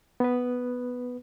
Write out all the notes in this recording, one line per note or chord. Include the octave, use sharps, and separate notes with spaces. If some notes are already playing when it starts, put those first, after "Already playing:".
B3 B4